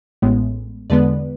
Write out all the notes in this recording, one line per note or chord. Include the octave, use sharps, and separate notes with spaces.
A1 A2 G#3 B3
E2 D3 G#3 B3 B4 D5